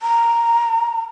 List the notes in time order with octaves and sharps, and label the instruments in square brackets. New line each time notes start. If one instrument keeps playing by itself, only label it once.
[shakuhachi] A#5